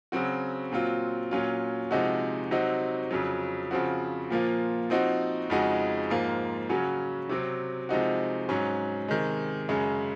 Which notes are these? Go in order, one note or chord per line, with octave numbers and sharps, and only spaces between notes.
C#3 F#3 C4 F#4
A#2 F#3 C4 F4
A#2 F#3 C#4 F4
C3 F3 G#3 D#4 F#4
C3 F#3 C4 D#4 F#4
F2 C#3 F#3
C#3 F3 C4 F#4
A#2 F3 A#3 F4
F3 C4 D#4 F#4
F2 C#3 G#3 D#4 F#4
G#2 F3 A#3 F4
C#3 F#3 C#4 F#4
C3 F#3 C4
C3 F3 G#3 D#4 F#4
G#2 F#3 C#4
C3 D#3 G#3
F#2 C#3 G#3 C#4